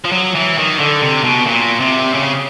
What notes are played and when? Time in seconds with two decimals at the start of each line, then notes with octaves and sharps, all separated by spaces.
0.05 F3
0.12 F#3
0.35 E3
0.58 D#3
0.80 D3
1.02 C3
1.24 B2
1.47 A#2
1.80 C3
2.14 C#3